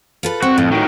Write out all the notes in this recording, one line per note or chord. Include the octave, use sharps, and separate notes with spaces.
F4 A4 B4
C4 F#4
F2 A2
D#3 F#3